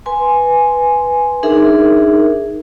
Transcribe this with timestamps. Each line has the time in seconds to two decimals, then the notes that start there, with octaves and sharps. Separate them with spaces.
0.06 B4 G#5 C6
1.43 D4 D#4 G#4 A#4 E5